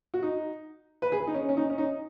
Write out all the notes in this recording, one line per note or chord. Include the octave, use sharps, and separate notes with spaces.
F#4
D#4
B4
G#4
D#4
C#4
C#4
D#4
C#4
D#4